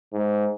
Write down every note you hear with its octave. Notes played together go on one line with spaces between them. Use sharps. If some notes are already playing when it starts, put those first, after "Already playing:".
G#2